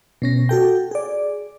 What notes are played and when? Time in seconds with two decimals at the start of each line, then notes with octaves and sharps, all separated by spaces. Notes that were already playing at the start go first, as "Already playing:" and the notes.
0.22 B2 C#4 A#6
0.49 F#4 A4 G5
0.91 G#4 D5